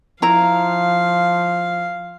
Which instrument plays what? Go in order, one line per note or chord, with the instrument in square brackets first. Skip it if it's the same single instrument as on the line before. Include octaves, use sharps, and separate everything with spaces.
[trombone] F3 [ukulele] E4 A#5 [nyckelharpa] F5